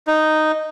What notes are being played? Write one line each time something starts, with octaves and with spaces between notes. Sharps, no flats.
D#4